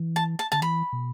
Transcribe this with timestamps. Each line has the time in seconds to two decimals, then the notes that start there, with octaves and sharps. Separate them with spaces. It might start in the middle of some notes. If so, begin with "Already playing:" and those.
Already playing: E3
0.16 A5
0.39 A5
0.52 D3 A5
0.62 E3 B5
0.93 B2